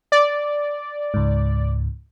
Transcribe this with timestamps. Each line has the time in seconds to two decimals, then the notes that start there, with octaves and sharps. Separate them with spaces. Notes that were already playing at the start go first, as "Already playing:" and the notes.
0.12 D5
1.14 C#2 G#2